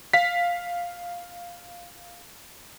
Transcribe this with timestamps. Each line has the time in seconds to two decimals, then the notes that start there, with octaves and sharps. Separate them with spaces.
0.14 F5 B6